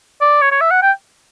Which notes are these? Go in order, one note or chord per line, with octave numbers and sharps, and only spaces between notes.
D5
C#5
C#5
E5
F#5
G5